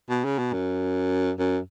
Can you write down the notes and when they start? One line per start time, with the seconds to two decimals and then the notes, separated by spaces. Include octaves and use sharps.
0.09 B2
0.24 C#3
0.38 B2
0.53 F#2
1.39 F#2